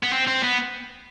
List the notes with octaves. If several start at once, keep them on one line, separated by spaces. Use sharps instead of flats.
B3
C4
C4
B3